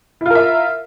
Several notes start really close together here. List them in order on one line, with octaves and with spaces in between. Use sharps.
E4 F4 A#4 E5